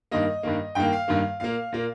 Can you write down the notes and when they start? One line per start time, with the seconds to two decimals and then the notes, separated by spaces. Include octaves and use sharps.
0.11 G2 D#3 A#3 D#5
0.43 G2 D#3 A#3
0.75 G2 D#3 A#3 G5
0.93 F5
1.08 G2 D#3 A#3
1.40 A#2 A#3 F5
1.72 A#2 A#3